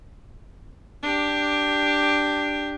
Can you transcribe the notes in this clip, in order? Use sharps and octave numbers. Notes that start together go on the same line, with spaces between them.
D4 G4